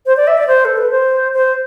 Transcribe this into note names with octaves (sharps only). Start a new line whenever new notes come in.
C5
D5
E5
D5
C5
A4
B4
C5
C5